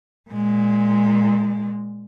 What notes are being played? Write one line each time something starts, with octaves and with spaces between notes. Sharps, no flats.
A#2 G#3